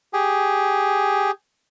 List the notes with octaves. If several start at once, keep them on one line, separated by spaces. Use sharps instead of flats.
G4 G#4